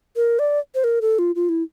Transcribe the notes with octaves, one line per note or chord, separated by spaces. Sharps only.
A#4
D5
C5
A#4
A4
F4
F4
E4